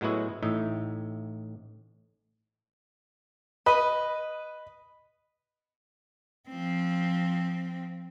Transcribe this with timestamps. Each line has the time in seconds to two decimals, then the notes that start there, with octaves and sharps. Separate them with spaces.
0.01 A2 F#3 G#3 B3 E4 F#4
0.42 A1 A2 D#4 E5
3.66 B4 D#5 B5
6.49 F3 C4